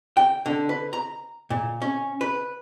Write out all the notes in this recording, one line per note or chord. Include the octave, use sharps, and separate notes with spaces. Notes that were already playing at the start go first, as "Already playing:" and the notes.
G5
D3
B4
A#5
A#2
C#4
B4